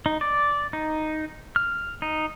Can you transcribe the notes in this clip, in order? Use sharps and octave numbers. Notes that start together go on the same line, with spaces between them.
D#4
D5
D#4
F6
D#4